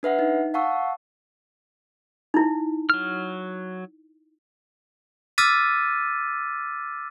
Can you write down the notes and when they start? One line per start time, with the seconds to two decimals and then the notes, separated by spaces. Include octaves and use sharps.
0.03 D4 B4 E5 F#5
0.19 D#4
0.54 F5 F#5 A5 C#6 E6
2.34 D#4 E4
2.90 F#3 F6
5.38 D6 E6 F6 A6 B6 D#7